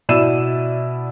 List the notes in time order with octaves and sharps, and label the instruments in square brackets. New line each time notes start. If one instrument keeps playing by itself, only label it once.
[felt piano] B2 E4 D5 E6 D#7 E7